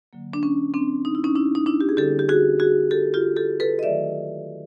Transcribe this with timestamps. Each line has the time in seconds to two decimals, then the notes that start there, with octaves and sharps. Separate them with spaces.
0.13 D3 F#3 A#3
0.33 D4
0.43 C#4
0.74 C4 D4
1.05 D#4
1.15 E4
1.24 C#4 D#4
1.35 D4 E4
1.55 D#4
1.66 D4 E4
1.81 G4
1.89 G#4
1.97 D3 G3 A#3 G4 A4
2.19 G4
2.29 F#4 G#4
2.60 F#4 G#4
2.91 G4 A4
3.14 F4 G4
3.37 G4 A4
3.60 A4 B4
3.79 D#5
3.83 D#3 F#3 A3 D5 E5